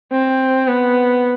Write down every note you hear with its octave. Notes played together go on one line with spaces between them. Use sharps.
C4
B3